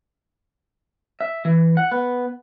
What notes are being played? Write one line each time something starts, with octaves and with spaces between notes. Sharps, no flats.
E5
E3
F#5
B3